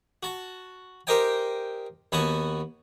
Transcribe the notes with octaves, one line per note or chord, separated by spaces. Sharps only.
F#4 A5
G4 A#4 C5 D#5 G5 G#5
D#2 B3 F#4 G#5 A5